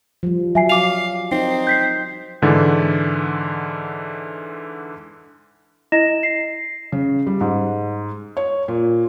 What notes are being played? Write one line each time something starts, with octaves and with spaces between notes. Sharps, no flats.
F3 G3
F#3 E5 G#5 C7
F5 D6 F7
C4 D#4 C7
G6 B6 C7
G#2 D3 E3 A6
E4 D#5 A#6 E7
C7
C#3
G3
G#2
C#5
A#2